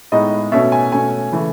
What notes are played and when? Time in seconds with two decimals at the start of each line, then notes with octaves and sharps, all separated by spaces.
0.12 A2 G#3 B3 D#4 D#5
0.52 B2 A3 C#4 E5
0.72 G#5
0.92 B2 A3 C#4 G#5
1.32 C#3 E3 A3